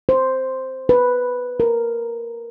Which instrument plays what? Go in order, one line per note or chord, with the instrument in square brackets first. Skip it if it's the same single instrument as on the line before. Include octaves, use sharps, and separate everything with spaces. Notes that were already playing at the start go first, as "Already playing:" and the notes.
[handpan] C5
B4
A#4